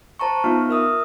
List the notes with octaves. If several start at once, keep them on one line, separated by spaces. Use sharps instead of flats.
C5 A5 A#5 C#6
B3 D#4 F4 E5 C#6 F6
A#4 E5 D#6 F6